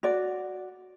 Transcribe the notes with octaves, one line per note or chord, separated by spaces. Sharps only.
F#4 D5